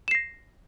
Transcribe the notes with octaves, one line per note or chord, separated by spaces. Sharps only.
A#6 C7 E7